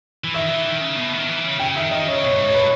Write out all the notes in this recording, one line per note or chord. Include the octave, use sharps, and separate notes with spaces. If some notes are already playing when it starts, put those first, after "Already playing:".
E3
D#3 E5
E3
D#3
C#3
B2
D#3
E3
C#3
C#3 G5
D#3 E5
D#3 D#5
C#3 C#5
B2 C#5
G2
G#2
C#5
B2 B4